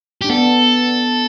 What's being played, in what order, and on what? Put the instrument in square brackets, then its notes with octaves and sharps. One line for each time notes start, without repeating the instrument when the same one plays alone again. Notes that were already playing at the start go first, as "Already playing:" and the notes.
[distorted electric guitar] G4
[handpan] D4
[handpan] B3 [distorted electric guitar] A4